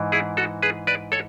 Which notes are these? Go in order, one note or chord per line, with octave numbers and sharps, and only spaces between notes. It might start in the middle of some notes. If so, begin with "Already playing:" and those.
Already playing: G#2 E3
E4 G#4
F#4 A4
G#4 B4
B4 D5
A4 C#5